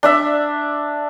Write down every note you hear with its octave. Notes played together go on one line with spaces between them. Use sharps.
D4 D5 E5